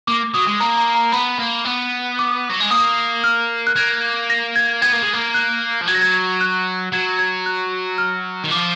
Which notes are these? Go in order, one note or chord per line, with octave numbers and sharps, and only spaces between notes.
A#3 D6
F#3 D#6
G#3
A#3 A#5
A#5
A#5
B3 B5
A#3
B3
D6
F#3
G#3
A#3 D#6
F6
F#6
A#3 G#6
A#6
G#6
B3 G#6
A#3
G#3
A#3
F#6
F3
F#3 G#6
A#6
G#6
G#6
F#6
F#3 G#6
G#6
F#6
F6
D#3
F3 D6